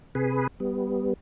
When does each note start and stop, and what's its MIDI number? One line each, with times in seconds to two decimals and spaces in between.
0.15 0.47 48
0.15 0.47 68
0.15 0.47 71
0.60 1.13 55
0.60 1.13 59